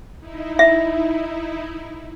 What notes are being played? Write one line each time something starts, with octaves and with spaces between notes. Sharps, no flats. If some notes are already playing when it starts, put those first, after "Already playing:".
D#4 E4
E5